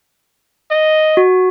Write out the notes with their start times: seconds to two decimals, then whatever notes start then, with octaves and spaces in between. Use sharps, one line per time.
0.71 D#5
1.17 F#4